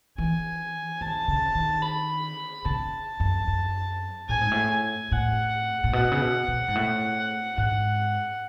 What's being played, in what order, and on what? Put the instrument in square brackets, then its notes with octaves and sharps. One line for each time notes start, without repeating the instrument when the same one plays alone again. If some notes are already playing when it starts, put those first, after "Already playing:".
[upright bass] E3 [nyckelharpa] G#5
[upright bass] D#3 [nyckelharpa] A5
[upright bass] C#3
D#3
[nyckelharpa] B5
[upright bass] C#3 [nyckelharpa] A5
[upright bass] F#2
F#2
[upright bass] A2 [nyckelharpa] G#5
[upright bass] G#2
A2
[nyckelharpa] G#5
[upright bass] A2 [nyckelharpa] F#5
[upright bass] A2
[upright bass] B2 [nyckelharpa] F#5
[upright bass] C#3
B2
B2
G#2
A2
[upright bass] G#2 [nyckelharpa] F#5